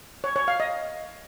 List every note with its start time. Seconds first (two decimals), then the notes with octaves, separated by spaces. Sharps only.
0.24 C#5
0.36 C#5
0.48 F5
0.60 D#5